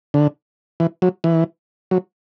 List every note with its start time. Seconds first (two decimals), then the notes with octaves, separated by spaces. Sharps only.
0.14 D3
0.80 E3
1.02 F#3
1.24 E3
1.91 F#3